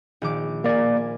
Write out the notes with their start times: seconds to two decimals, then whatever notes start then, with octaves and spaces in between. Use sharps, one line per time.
0.22 A#1 D#3 D6
0.64 A#3 A#4 D5 G#5